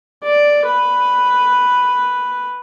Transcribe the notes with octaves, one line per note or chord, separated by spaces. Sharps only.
D5
B4